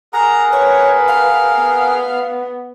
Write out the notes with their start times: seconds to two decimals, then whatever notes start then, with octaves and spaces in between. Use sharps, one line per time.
0.13 G#4 A#4 F#5 A#5
0.52 B4 C#5
1.08 F5
1.58 B3